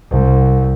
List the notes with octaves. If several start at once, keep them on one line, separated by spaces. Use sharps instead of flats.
C2